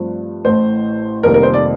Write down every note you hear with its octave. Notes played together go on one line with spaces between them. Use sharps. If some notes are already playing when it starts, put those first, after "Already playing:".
Already playing: G2 F3 A3 C4
A1 A2 A3 C5
F1 F2 D#3 G3 A#3 A#4
A#4
C5
D5